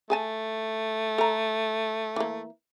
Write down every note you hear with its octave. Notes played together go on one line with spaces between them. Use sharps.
A3 G#4 G#5 A5
A4 A#5
E3 A#3